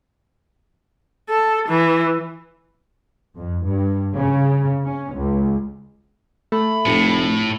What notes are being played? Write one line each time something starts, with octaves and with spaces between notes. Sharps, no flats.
A4
E3
F2
G2
C#3
C#4
C#2
A3 B5
F1 A2